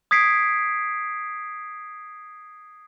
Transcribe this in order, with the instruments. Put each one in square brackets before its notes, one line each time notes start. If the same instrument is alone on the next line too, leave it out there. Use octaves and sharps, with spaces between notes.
[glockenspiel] D#6 G#6 B6 C7 D7